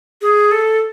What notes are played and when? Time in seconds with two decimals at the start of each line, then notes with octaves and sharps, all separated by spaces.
0.22 G#4
0.51 A4